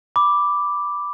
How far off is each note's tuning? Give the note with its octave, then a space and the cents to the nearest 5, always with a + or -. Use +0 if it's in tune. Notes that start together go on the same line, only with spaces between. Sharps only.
B5 +0 D6 +0